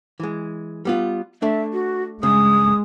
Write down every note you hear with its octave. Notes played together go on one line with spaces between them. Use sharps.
E3 G#3
G3 B3 F4
A3 D4 E5
F#4
G2 C#3 G#3 D#6